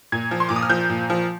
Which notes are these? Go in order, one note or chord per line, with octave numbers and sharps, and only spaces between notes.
A#2 G#6
F3
C6
A#2 D6
D#6
F6
F3 G6
A#2
F3